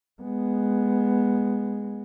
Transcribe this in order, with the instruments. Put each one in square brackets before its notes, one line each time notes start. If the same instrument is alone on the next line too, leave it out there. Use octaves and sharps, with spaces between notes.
[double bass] G#3 B3